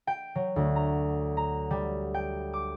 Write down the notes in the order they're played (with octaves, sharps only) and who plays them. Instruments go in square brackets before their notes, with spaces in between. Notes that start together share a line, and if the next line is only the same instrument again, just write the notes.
[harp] G5
F#3
D2
A#5
A#5
G3
G5
D6